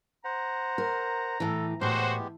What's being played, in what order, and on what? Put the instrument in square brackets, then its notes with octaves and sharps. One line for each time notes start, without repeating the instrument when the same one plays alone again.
[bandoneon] C5 F#5 [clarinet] A#5
[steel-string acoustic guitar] A#4
[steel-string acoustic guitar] A2 E3 [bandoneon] A4
[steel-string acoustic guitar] A2 [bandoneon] G#3 B3 G4 [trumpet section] F#4 C5